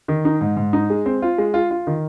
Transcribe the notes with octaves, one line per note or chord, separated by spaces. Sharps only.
D#3
D#4
G#2
G#2
D#4
G#3
C4
F4
G#3
F4
F4
D#3